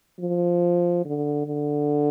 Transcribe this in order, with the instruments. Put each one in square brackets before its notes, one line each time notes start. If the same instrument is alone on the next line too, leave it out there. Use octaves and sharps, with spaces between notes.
[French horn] F3
D3
D3